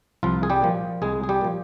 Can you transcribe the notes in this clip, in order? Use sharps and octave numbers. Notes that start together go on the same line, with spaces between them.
C2 F3 F4
G#4
G3 G4
A#2 F3
C2 G#3 G#4
G#4
G3 G4
A#2 F3